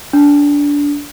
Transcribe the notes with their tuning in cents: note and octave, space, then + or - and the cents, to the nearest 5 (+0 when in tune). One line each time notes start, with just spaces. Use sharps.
D4 -20